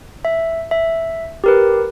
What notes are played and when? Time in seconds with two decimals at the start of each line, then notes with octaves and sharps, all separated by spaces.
0.25 E5
0.71 E5
1.44 G4 A#4 B4